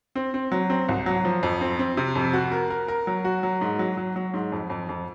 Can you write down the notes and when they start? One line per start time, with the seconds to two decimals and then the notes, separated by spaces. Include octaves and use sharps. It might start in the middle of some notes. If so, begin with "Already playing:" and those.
0.16 C4
0.34 C4
0.52 F#3
0.70 C4
0.89 C2
1.06 F#3
1.25 F3
1.43 F2
1.61 C4
1.79 C4
1.97 C3
2.15 F2
2.33 F#4
2.52 A#4
2.70 A#4
2.88 A#4
3.07 F#3
3.25 F#4
3.43 F#3
3.61 G#2
3.79 F#3
3.97 F#3
4.16 F#3
4.34 G#2
4.52 F2
4.70 F2
4.89 F2